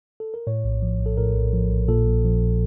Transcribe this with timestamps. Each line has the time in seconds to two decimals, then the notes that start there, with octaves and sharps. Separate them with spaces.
0.20 A4
0.34 A#4
0.47 A2 C#5
0.64 A#1
0.82 F3
1.00 A#1
1.06 A4
1.17 A2 A#4
1.35 A#1
1.53 F3
1.71 A#1
1.88 A#2 A4
2.06 A#1
2.24 F3